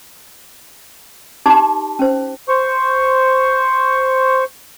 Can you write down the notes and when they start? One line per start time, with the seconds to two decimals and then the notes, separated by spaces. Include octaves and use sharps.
1.46 D#4 G4 A5 D6
1.99 C#4 C5
2.49 C5 C#6